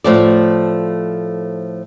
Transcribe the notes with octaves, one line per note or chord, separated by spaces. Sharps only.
A2 F3 A3 D5